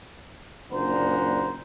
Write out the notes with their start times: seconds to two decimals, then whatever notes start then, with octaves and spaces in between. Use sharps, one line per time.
0.71 F#1 A#2 D4 C5 F#5 A#5